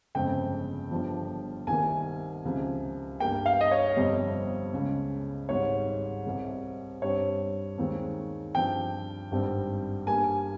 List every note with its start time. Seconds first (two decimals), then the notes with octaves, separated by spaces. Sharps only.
0.15 G1 F2 C#3 G#3 C4 G5
0.91 G1 G2 F3
1.67 C2 C3 D#3 A#3 G#5
2.44 C#2 C3 F3
3.20 G2 G3 A#3 G5
3.46 F5
3.61 D#5
3.71 C#5
3.96 G1 F2 C3 G3 C4
4.73 C#2 C#3 G#3
5.49 G#1 G#2 G3 C#5
6.26 C2 C3 G3
7.02 G2 G3 C4 C#5
7.78 D#2 D#3 G#3 C4
8.55 G2 F3 C4 G5
9.31 G#1 G2 G3 C4
10.07 G2 G3 A#3 G#5